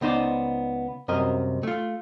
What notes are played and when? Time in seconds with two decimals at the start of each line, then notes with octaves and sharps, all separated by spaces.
0.01 C#2 B3 D#4 C5 D5
1.08 C2 F#2 C3 A#4 D#5
1.63 A3 F4